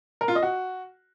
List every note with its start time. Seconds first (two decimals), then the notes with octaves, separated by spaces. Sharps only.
0.21 A#4
0.28 F4
0.35 D#5
0.43 F#4